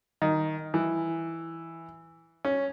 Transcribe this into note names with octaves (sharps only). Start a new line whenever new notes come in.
D#3
E3
C#4